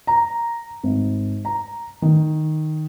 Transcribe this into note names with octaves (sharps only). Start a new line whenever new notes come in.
A#5
G#1
A#5
D#3